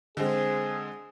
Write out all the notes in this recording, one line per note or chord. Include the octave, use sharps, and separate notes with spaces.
D3 G#3 C4 G#4